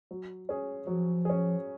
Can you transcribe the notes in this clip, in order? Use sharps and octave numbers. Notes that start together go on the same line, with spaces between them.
F#3
C#4 G#4
F3 F#3
C#4 G#4